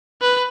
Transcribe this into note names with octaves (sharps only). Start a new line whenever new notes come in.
B4